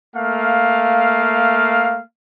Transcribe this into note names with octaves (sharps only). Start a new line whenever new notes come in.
A3 A#3 F5